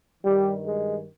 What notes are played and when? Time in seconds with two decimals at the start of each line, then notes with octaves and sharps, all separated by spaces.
0.23 G2 D#3 G3
0.66 G#3